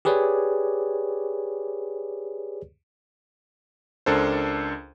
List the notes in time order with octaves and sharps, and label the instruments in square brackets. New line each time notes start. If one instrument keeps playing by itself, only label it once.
[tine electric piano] G4 G#4 B4 C#5 D5
[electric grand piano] C#2 D4 A4 A#4 C5